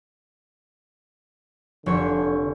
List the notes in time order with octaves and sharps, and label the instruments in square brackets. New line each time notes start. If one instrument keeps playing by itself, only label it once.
[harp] F1 C#5 G#6 [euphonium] D3